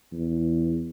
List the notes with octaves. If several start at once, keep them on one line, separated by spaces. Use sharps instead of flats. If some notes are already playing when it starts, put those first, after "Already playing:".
E2